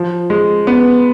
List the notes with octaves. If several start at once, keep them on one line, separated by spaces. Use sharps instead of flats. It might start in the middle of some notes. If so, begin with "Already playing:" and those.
Already playing: F3
G#3
B3